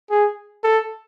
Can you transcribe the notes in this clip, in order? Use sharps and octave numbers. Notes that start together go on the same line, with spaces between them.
G#4
A4